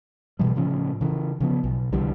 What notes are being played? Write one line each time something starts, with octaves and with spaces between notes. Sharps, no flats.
B2 E3 G3
A2 C#3 F3 C#4
C#3 E3
C#3 F3 B3
B1
C2 D3 E3 G3